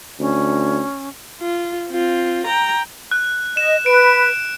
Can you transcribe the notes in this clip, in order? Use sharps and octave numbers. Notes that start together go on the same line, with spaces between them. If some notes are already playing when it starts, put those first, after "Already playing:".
D2 C#4
F4
C4 F4
G5 A#5
F#6
D#5 E7
B4 D7